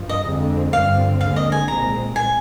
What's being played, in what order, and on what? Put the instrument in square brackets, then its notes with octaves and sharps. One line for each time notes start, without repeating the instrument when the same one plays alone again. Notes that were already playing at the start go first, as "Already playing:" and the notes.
Already playing: [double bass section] G2 F3
[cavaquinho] D#5
[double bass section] F2 D3 G#3 C4
[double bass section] G2 D3 F3 C4 [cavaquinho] F5
[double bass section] D#2 D3 G#3 C4 [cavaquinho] F5
[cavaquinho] D#5
G#5
[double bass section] C2 A#2 G#3 C4 [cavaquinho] A#5
[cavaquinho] G#5